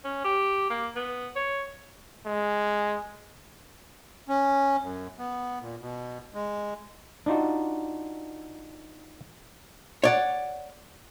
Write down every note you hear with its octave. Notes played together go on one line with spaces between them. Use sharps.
C#4
G4
A#3
B3
C#5
G#3
C#4
F#2
B3
A#2
B2
G#3
D4 D#4 F4 F#4
C#5 D5 F#5